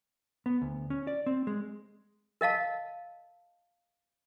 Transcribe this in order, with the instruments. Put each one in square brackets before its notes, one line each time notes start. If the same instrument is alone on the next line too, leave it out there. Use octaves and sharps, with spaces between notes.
[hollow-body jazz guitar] B3
D2
C#4
D5
C4
G#3
[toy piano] A#4 D#5 F5 A5